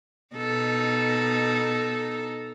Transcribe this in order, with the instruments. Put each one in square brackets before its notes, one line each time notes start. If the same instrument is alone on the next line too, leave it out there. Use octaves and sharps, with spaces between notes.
[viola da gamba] B2 D#4 A4